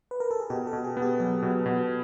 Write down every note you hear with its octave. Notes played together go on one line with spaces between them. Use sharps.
B4
A#4
A4
G#4
B2 G4
A4
B2
G#4
B3
G4
F#3 G#4
B2
B2